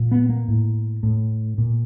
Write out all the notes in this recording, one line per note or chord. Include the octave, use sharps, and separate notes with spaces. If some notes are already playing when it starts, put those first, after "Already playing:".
Already playing: A#2
B3
A#3
A2
A2
A#2